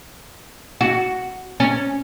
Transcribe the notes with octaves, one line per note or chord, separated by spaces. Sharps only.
F#4
C#4